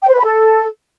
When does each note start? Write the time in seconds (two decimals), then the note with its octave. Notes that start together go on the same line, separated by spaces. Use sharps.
0.02 G5
0.08 C5
0.13 B4
0.19 B5
0.24 A4